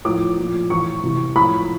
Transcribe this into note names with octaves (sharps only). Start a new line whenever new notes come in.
A2 F3 D6
A#2 F3
A2 E3 C#6
C3 E3
A2 F3 B5